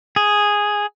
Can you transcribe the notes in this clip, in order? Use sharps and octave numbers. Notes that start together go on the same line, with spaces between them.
G#4